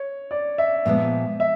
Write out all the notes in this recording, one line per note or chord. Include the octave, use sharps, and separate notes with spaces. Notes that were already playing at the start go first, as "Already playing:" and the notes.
Already playing: C#5
D5
E5
A#2 F3 G#3 B3 E5
E5